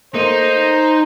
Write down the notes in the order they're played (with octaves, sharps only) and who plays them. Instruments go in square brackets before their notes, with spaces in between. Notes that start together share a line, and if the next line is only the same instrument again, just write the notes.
[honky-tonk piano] A3 A#3 [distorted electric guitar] D#4 [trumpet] C5